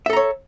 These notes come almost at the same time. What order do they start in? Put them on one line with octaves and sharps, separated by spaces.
E5 A4 A#5 C#5